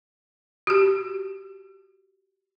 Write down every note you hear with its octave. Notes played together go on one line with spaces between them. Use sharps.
F#4 G4